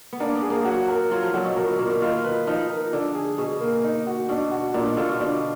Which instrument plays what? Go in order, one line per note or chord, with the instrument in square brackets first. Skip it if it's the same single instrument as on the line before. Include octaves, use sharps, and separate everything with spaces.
[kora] B3
[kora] A#3 [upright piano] D4
[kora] B3
[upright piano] G#4
[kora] A#3
[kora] F#3 [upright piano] F#4
[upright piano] A#4
[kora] F#3 [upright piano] F4
[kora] F3
[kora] D3 [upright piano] F#3
[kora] B2
[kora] B2 [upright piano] A#4
[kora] B2
[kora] A#2 [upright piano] A#3
[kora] B2
[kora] D#3 [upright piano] F4
[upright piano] B4
[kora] F3 [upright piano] D#4
[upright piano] A#4
[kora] D3 [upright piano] D4
[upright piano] G#4
[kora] B2 [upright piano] G#4
[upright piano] A#3
D#4
F#4
[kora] B2 [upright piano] D4
[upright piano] F#4
[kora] A#2 [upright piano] D4
[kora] B2
[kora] D3 [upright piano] F4
[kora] B2
[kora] B2 [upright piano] D4